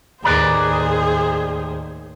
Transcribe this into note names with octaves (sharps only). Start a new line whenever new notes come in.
D#2 A2 G#4 B4 C5 D5 A#5